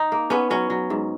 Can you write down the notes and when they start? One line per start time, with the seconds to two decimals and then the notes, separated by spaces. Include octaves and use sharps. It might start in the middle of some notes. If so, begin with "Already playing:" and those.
Already playing: D#4
0.12 A#3
0.30 B3 C#4
0.50 F#3 C#4
0.70 F#3
0.90 G#2